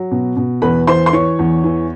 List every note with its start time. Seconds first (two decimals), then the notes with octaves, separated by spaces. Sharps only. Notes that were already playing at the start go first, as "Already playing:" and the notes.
Already playing: F#3
0.11 B2
0.36 B2
0.62 E2 B4 B5
0.87 E3 C5 C6
1.06 C6
1.13 E3 C#5 C#6
1.39 E2
1.64 E3